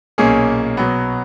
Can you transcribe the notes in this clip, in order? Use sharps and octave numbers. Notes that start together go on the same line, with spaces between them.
B1 A#2 A#3 C#4 G#4
B2 F#3 B3